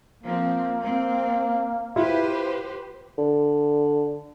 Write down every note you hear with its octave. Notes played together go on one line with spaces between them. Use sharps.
F3 A#3 C4
C4
E4 F4 G4 B4 C5
D3